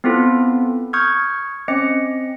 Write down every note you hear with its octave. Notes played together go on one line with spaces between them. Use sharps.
B3 C4 E4 F4 A4
C#6 D#6 F6 G6 G#6
C4 C#4 D#5 C#7